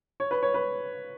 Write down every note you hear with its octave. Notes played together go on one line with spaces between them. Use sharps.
C#5
B4
C#5
B4